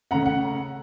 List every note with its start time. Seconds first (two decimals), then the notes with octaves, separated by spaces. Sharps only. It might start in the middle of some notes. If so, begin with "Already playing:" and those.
0.11 C#3 A3 C#4 F#5 A#5
0.26 F#5